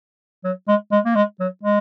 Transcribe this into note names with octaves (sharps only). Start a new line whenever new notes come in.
F#3
G#3
G#3
A#3
G#3
F#3
G#3